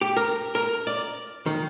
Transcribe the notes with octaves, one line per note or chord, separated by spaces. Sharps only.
G4
A#4
A#4
D5
D#3